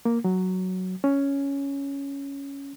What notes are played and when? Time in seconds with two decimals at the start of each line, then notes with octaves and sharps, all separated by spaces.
0.05 A#3
0.24 F#3
1.04 C#4